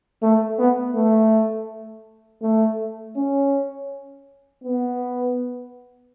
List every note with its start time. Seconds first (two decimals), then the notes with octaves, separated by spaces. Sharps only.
0.22 A3
0.58 B3
0.95 A3
2.42 A3
3.16 C#4
4.64 B3